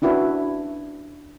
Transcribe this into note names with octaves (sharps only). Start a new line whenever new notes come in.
C#4 D4 E4 F#4 B4